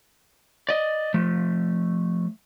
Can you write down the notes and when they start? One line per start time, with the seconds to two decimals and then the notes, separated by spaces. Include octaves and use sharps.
0.69 D5 D#5
1.14 F3 A3